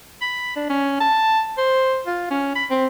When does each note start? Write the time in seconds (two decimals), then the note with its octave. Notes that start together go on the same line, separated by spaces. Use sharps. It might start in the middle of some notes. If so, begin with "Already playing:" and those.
0.21 B5
0.56 D4
0.70 C#4
1.01 A5
1.58 C5
2.06 F4
2.31 C#4
2.55 B5
2.70 C4